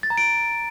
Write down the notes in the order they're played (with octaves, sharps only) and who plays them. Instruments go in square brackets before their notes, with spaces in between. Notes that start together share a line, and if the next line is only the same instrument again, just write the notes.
[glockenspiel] A6
A#5
D7